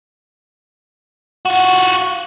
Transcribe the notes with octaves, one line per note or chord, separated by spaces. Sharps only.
F4 F#4